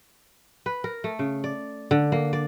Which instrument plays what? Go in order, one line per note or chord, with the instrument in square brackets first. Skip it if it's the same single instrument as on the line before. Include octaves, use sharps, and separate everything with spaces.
[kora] B4
A#4
A3
C#3
D5
D3
A#3
D5